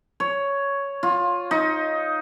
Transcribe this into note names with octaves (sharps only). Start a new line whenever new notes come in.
C#5
F4
D#4